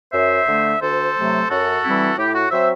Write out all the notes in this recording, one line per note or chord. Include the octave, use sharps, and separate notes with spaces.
F#2 C5 E5
D3 A3
D2 A4 C5
C3 F#3 A3
F#2 F#4 A4
E3 G3 C4 E4
A2 E4 G4
F#4
F#3 C4 C5 E5